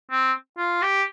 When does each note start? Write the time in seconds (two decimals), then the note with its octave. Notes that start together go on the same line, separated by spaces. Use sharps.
0.11 C4
0.58 F4
0.82 G4